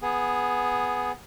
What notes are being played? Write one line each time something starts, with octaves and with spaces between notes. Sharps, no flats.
B3 G#4